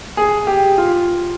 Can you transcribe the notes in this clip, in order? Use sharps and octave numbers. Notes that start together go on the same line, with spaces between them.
G#4
G4
F4